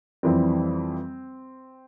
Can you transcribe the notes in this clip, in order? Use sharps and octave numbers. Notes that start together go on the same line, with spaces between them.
F2 E3 G3 C4